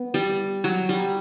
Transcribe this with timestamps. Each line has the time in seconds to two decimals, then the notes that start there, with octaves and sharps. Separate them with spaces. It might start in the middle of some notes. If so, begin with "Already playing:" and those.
Already playing: B3
0.14 G3
0.64 F#3
0.89 G3